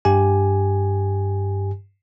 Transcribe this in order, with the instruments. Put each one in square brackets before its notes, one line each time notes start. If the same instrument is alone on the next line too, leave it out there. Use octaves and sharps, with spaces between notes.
[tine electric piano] G2 G4 G#5